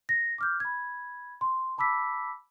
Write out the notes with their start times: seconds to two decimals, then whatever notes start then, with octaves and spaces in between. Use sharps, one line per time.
0.09 A#6
0.38 D6 F6 G6
0.60 B5 G#6
1.41 C6
1.78 A5 B5 D6 E6 B6